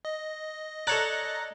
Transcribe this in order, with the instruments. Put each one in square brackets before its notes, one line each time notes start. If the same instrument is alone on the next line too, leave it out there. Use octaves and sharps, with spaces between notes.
[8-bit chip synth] D#5
[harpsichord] A4 C#5 D5 [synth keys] A#5 F#6 A6